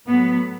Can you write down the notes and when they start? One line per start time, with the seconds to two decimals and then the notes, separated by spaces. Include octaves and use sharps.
0.08 A2 F#3 B3